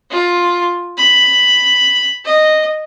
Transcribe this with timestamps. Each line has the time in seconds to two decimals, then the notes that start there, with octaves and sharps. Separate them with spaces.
0.11 F4
0.97 B5
2.25 D#5